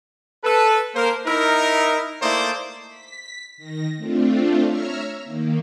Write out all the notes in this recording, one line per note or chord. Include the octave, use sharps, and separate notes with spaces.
A4 B4
A#3 A#4 C5
D#4 E4 A#4
A3 A#3 D#4 E4 C5 D5
B6
D#3 A#6
A3 C4 D4 F4
C#5 E5 A#5 E6 F6
D#3 A#3